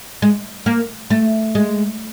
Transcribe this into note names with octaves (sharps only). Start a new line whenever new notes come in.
G#3
A#3
A3
G#3